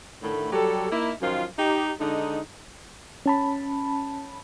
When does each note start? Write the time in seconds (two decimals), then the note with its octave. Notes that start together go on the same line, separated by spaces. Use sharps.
0.22 A2 D3 D#3 A3 B5
0.53 F#3 G3 G4 A4
0.91 A#3 D#4 E4
1.22 F#2 D#3 F3 F4
1.59 D#4 G4
2.00 D3 G#3 D#4
3.26 C#4 A5 B5